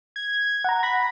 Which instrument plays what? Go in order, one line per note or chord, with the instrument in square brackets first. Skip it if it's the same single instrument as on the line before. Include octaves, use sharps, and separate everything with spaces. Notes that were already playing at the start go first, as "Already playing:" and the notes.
[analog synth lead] G#6
[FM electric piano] F#5 A#5
[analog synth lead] B5 [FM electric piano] A#6